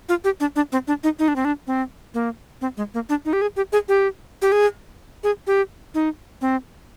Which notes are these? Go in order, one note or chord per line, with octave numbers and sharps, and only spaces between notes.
F4
G4
D4
D4
C4
D4
D#4
D#4
D4
C4
D4
C4
A#3
C4
G#3
A#3
D4
D#4
G4
G#4
G4
G#4
G4
G4
G#4
G#4
G4
D#4
C4